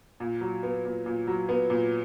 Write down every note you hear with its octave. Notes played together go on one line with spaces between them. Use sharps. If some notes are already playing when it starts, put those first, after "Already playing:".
A#2
F#3
B3
A#2
A#2
F#3
B3
A#2